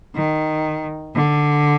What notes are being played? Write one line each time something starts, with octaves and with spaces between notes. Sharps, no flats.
D#3
D3